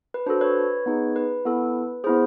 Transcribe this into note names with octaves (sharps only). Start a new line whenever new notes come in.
B4
D4 F#4 A4 C5
B4 C#5
B3 D#4 G#4
B4
B3 E4 A4
B3 E4 G#4 C5